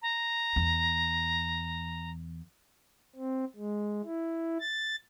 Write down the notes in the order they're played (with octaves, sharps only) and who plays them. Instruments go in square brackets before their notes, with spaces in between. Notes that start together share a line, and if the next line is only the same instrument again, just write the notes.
[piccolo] A#5
[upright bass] E2
[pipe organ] C4
G#3
E4
A6